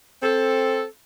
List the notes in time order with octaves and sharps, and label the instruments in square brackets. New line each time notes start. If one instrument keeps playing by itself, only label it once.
[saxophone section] C4 A4